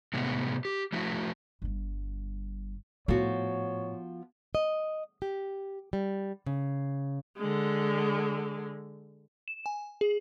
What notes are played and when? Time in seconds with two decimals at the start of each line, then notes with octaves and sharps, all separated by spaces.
0.14 A2 C3 G#3 B3
0.65 G4
0.93 F3 A3 E4 F#4
1.62 G1 G2
3.08 A2 F3 B3 F#4 C#5
4.55 D#5
5.22 G4
5.93 G3
6.46 C#3
7.37 D3 G#3
9.48 E7
9.66 G#5
10.01 G#4